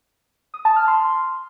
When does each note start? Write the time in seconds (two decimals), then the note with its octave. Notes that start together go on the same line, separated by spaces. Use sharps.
0.54 D#6
0.65 A5
0.76 F6
0.88 C6